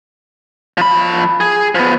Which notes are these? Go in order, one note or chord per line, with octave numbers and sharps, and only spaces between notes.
F3 B5
G#4
F3 B3